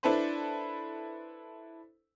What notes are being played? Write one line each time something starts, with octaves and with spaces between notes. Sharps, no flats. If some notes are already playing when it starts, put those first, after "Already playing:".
D4 E4 A4 B4 C5